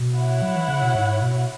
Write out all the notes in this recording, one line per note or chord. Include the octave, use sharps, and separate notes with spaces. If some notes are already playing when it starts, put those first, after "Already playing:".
Already playing: B2
E4 C#5 F#5
F#3
E3
C#3
B2
G#2
B2